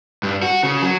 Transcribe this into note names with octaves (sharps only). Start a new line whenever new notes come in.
G2
F#4
C#3
F#3